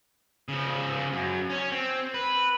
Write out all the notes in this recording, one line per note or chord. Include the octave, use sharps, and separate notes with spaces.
C#3 F3
F#2
C#4 C#5
C4
B4